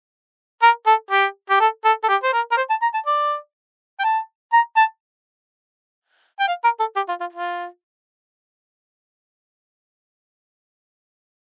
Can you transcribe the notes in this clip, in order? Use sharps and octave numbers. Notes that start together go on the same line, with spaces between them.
A#4
A4
G4
G4
A4
A4
A4
G4
C5
A#4
A#4
C5
A5
A#5
A5
D5
G5
A5
A#5
A5
G5
F5
A#4
A4
G4
F4
F4
F4